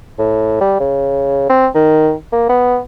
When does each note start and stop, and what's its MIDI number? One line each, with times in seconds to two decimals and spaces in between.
0.19 0.58 45
0.61 0.75 55
0.80 1.47 49
1.49 1.67 60
1.74 2.13 51
2.32 2.49 58
2.49 2.78 59